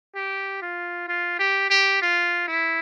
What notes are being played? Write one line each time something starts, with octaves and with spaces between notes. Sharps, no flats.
G4
F4
F4
G4
G4
F4
E4